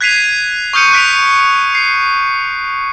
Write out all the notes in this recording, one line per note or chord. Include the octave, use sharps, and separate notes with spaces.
F#6 G#6 B6 C7 D#7 F7
C#6 D#6 F6 G6 C#7 D#7
F#6 B6 D7 F7
C7